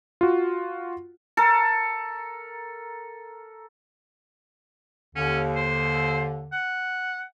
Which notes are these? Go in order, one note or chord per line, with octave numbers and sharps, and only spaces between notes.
F4 F#4
A4 A#4
D#2 D3 C#4
C5
F#5